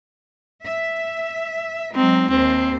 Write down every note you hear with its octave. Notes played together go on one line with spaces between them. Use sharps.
E5
F#3 G#3 C4 D#4
D#2 C4 C5